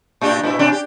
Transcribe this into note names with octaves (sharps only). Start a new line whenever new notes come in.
A2 D4 G4
G#2 B2 E4
B2 C#4 D4
G4